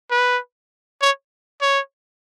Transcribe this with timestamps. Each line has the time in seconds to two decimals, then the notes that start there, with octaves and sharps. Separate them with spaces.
0.11 B4
1.02 C#5
1.62 C#5